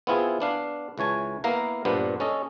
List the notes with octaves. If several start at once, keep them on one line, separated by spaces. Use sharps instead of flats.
B3 C4 E4 F4 G#4
B3 D4 F5
C#2 E3 C#5 G#5 A5
A#3 B3 E4 A#4 F5
G2 A#2 B3 D4 C5
C#4 A4 D#5